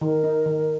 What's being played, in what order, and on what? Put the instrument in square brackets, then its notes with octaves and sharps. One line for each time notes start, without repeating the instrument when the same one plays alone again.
[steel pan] D#3 [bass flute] A#4
[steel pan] D#4
D#3